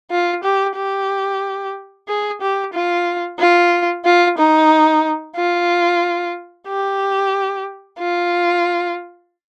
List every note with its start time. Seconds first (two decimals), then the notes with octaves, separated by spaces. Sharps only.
0.11 F4
0.44 G4
0.76 G4
2.08 G#4
2.41 G4
2.74 F4
3.39 F4
4.05 F4
4.38 D#4
5.36 F4
6.68 G4
7.99 F4